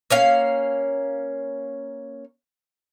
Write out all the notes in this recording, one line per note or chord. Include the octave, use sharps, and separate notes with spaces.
A#3 C#4 F5